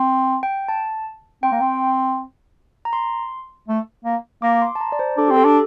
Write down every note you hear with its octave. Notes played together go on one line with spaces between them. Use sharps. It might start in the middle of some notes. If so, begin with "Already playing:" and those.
Already playing: C4
G5
A5
C4 G5
A#3
C4
A#5
C6
A3
A#3
A#3 D6
C6
A5
A#5
D5
C5
D4 A4
C4 G4
A4
D4